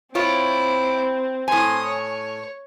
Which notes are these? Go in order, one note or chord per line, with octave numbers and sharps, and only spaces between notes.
C4 E4 F4 C#5 D6
A2 G#5 C6 D#6
C#5